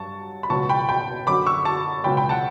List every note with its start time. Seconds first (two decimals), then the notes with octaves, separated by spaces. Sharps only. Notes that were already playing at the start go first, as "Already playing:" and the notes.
Already playing: G2 F#3 A5 C#6
0.43 B5
0.50 C#2 B2 F#3 A5 C#6
0.69 G5 B5
0.89 G5 B5
1.27 F#2 D3 F#3 B5 D6
1.46 C#6 E6
1.65 A5 C#6
2.04 C#2 B2 F#3 G5 B5
2.17 G5 B5
2.29 F#5 A5